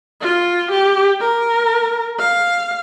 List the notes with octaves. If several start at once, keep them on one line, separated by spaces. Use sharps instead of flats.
F4
G4
A#4
F5